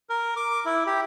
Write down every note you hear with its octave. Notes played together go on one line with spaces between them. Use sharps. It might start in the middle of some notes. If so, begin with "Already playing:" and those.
A#4
D6
E4
G4